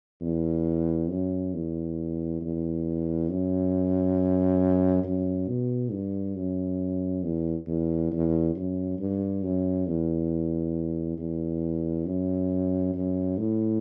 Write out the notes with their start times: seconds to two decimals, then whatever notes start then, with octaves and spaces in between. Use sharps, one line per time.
0.21 E2
1.10 F#2
1.54 E2
2.41 E2
3.29 F#2
5.04 F#2
5.48 B2
5.91 G2
6.36 F#2
7.23 E2
7.67 E2
8.12 E2
8.55 F#2
8.99 G2
9.43 F#2
9.87 E2
11.18 E2
12.06 F#2
12.94 F#2
13.38 A2